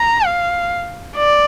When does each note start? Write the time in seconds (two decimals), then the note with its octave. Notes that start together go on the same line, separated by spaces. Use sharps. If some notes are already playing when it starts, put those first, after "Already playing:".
Already playing: A#5
0.26 F5
1.17 D5